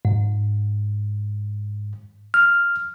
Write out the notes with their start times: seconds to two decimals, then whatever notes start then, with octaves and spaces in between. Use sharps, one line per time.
0.05 G#2
2.34 F6